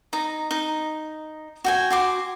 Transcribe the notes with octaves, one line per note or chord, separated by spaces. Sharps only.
D#4 A#5
D#4
F#4 G5 G#5
F#4 C6 D6